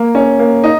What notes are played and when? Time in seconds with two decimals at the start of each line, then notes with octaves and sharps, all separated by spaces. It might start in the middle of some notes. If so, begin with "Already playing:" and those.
Already playing: A#3
0.15 C#4
0.39 A#3
0.64 D#4